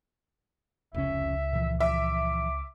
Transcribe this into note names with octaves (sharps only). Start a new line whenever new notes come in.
F1 C#2 C#4 E5
A#2 E3 F3
E5 D6